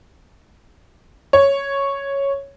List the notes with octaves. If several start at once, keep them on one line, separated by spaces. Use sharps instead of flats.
C#5